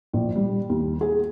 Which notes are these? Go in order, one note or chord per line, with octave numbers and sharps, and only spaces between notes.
A#1
G3
D#2
G#4